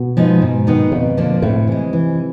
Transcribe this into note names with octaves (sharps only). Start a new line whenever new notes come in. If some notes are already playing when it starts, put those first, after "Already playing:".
Already playing: B2
F3 G#3 B3 D#4
G#2
D#3 G#3 B3 D#4
F2 B2
D3 F3 A#3 D4
A2 C3
E3 G#3
E3